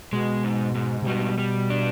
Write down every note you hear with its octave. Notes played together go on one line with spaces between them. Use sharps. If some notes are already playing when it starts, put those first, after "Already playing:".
B2 G#3
G#2
G#2
C3
B2 G3
G3
D4